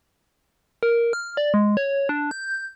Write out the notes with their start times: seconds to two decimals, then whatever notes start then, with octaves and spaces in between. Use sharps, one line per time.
0.83 A#4
1.13 F6
1.37 D5
1.54 G#3
1.77 C#5
2.09 D4
2.31 G6